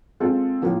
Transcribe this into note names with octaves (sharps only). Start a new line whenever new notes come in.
G#3 C4 F4 A4
A2 F3 A#3 C#4